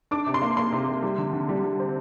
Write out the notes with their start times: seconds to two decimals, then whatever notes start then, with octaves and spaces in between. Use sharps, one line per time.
0.11 D4 D6
0.26 C3
0.34 C6
0.42 A#3
0.57 A#3 C6
0.72 C3
0.87 C3
1.02 G3
1.18 D3
1.33 D3
1.49 G3
1.64 G3
1.79 C4